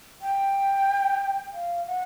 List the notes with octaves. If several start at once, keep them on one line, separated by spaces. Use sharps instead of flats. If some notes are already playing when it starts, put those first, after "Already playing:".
G5
F5
F#5